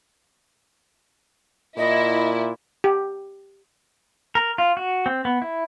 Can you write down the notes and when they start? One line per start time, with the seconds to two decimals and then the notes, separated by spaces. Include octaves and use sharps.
1.77 A#2 E4 D#5
2.84 G4
4.35 A#4
4.58 F4
4.77 F#4
5.06 C4
5.25 B3
5.42 E4